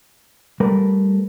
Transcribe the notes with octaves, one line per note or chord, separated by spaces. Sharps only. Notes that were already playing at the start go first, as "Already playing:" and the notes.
G3 A3 A#4 B4